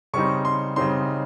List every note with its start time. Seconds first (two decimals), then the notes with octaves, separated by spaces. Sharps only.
0.13 C#3 G3 C4 D#4 C#6
0.45 C6
0.76 C#3 G3 C4 D#4 C6